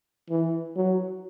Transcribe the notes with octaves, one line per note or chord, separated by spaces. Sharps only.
E3
F#3